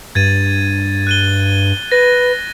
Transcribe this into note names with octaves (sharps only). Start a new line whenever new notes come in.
G2 G#6 A6 D#7
F#6 D#7 G7
B4 A#6